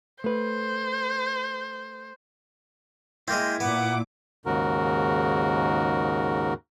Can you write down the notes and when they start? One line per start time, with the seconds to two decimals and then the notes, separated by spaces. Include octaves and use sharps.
0.24 A3 B4 C5
3.28 G#3 A#3 C4 E4 G6
3.60 A#2 B3 F#5 D6
4.46 D#2 G#2 C#3 F#4 A#4